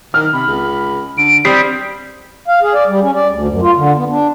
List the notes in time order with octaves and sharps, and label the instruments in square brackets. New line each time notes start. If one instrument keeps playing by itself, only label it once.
[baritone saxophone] D#3 [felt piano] F6
[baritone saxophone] C3 [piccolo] B5
[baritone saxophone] C#2
[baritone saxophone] D3 [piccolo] D7
[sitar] G3 [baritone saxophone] C4 [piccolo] D#6 [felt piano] C7
[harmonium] F5
G#4
D5
G3
C#4
D5
D2
F#2
F4
D3
B3
D4